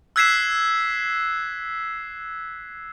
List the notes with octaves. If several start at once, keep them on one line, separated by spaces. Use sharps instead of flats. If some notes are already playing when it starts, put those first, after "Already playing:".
E6 F#6 G#6 B6 C7 E7